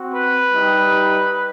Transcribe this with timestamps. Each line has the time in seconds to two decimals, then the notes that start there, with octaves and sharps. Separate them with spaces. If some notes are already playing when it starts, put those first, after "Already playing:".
Already playing: C4 F#4
0.13 B4
0.53 G3 D#4 G4